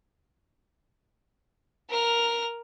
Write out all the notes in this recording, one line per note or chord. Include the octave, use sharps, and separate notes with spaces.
A#4 F6